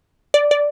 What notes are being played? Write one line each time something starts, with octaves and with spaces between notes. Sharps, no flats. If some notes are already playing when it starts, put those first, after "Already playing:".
D5
D5